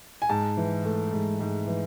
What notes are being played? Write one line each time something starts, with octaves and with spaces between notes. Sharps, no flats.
G#5
G#2 A5
E3
A3
G#2
G#2
E3